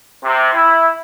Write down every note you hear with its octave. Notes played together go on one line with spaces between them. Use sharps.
C3
E4